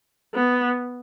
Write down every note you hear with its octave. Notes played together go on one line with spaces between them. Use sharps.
B3